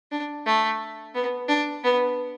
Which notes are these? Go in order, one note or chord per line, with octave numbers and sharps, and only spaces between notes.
D4
A3
B3
D4
B3